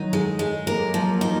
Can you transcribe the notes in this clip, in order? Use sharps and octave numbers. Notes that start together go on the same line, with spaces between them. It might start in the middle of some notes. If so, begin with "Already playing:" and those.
Already playing: D#3 F#3 D#4
G#3
G#3
F#3 A#3 A#4
F3
D#4